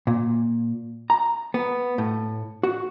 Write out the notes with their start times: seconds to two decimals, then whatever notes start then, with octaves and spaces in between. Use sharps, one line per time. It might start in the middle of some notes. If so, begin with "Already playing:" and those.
0.07 A#2
1.10 A#5
1.54 B3
1.98 A2
2.63 F#4